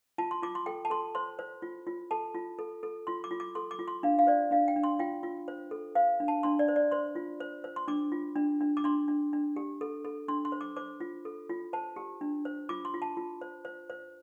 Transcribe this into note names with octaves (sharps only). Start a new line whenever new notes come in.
F4 A5
C6
F4 D6
C6
A4 G5
A5
A4 C6
C5 C6
C5
F4
F4
A4 A5
F4
A4
A4
F4 C6
D6
F4
D6
A4 C6
D6
F4
C6
D4 F5
F5
C5 D5
D4 F5
G5
D4
C6
F4 G5
F4
C5
A4
C5 F5
D4
A5
D4 C6
D5
C5
D5
C5 C6
F4
C5
C5
C6
D4 D6
F4
D4
D4
D6
D4 C6
D4
D4
G4
A4
A4
D4 C6
C6
C5
D6
C5 D6
F4
A4
F4
C5 A5
G4
D4
C5
F4 D6
C6
F4
A5
F4
C5
C5
C5